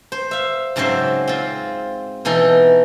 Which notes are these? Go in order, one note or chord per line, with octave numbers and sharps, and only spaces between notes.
C5
E5 F5
G#2 C#3 F#3 C4 C5 E5
C4 F4
B2 E3 D#4 A4